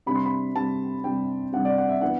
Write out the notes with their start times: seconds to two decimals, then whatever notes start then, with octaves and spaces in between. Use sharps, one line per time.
0.06 C3 G3 D4 B5
0.15 C6
0.26 B5
0.55 C3 G3 D4 A5
1.04 C3 G3 D4 G5
1.52 C3 G3 D4 F#5
1.65 D5
1.78 F#5
1.89 E5
2.01 E3 B3 D4 F#5